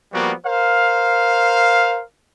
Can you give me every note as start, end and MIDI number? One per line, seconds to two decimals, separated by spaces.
0.13 0.33 53
0.13 0.33 55
0.13 0.33 58
0.13 0.33 59
0.13 0.33 66
0.45 2.01 70
0.45 2.01 72
0.45 2.01 77